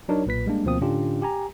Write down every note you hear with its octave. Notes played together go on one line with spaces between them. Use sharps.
F#3 D4 D#4 A#4 C#5
B1 A#2 B4 B6
G3 G#3 A#3 D4
D2 B2 F3 A#3 C4 D#6
A2 D3 C#4 D4 F4 G4
G4 G#5 A#5